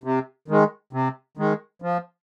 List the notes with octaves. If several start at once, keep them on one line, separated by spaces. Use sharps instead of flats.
C3
D#3 G#3
C3
D#3 G#3
F3